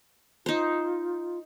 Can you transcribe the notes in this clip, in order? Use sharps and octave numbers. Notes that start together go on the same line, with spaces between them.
D#4 F4 C5